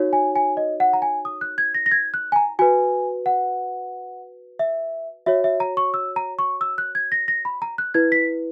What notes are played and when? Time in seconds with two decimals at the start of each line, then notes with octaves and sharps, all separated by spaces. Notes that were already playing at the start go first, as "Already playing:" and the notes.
Already playing: D#4 F#4 C#5
0.13 G#5
0.36 G#5
0.57 D#5
0.80 F#5
0.93 A#5
1.02 G#5
1.25 D#6
1.41 F#6
1.58 G#6
1.74 A#6
1.86 A#6
1.91 G#6
2.14 F#6
2.32 G#5
2.36 A#5
2.59 F#4 B4 G#5
3.26 F#5
4.59 E5
5.26 F#4 C#5 E5
5.44 E5
5.60 A#5
5.77 C#6
5.94 E6
6.16 A#5
6.39 C#6
6.61 E6
6.78 F#6
6.95 G#6
7.12 A#6
7.28 A#6
7.45 B5
7.62 A#5
7.78 F#6
7.94 E4 B4 G#6
8.12 B6